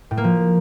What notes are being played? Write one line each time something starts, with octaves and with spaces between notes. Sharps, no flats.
A2
A#3
F3